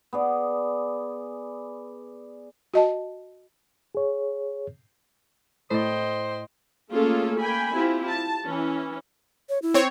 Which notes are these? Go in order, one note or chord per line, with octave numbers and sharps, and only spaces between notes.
B3 G#4 D5
F#4 D#5 A5
G#4 C#5
A2 C5 D5 D#5 G5
A3 A#3 C#4 F4 G#4 A4
A#3 G5 G#5 B5
C4 E4 F4 G4
A5
E3 C#4
C#5
E4
C4 C#5